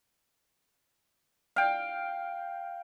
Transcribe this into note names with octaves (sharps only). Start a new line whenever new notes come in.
F5 G5